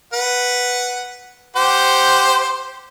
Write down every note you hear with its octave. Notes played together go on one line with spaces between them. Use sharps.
B4 F#5
G4 C5 F#5